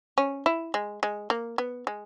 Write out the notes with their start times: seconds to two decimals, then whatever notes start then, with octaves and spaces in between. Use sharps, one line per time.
0.18 C#4
0.46 E4
0.74 G#3
1.03 G#3
1.30 A#3
1.58 B3
1.87 G#3